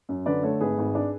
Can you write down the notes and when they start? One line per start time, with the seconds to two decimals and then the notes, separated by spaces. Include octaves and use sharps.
0.09 F#2
0.26 D3 B4 D5
0.43 A3 A4 C#5
0.60 G#1 G#4 B4
0.78 G#1
0.95 D4